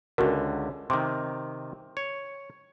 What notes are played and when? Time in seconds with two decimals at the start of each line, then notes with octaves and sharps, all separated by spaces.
0.18 C#2 D3 F#4 A#4
0.90 C3 D#3 C6 D6
1.97 C#5